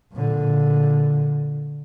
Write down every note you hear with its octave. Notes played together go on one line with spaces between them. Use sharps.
A#2 D3